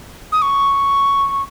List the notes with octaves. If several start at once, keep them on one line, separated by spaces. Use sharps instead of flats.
D#6
C#6